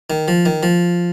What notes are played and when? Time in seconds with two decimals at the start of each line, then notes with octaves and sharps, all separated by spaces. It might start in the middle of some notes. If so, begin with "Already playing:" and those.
0.10 D#3
0.28 F3
0.46 D#3
0.63 F3